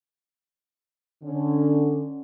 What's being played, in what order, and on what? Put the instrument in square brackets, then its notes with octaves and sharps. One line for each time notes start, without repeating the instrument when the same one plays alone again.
[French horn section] D3 C#4